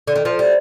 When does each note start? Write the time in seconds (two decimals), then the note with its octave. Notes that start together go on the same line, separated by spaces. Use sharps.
0.07 D3
0.15 D#3
0.25 F3
0.39 G3